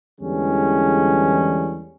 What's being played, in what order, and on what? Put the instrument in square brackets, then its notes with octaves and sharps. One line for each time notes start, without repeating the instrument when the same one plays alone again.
[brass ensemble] E2 D3 E3 G3 G#3 C#4